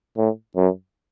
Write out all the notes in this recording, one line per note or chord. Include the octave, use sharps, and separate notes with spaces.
A2
F#2